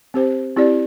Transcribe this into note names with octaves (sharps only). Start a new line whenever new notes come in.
C4 G4 C5
C4 E4 G4 D5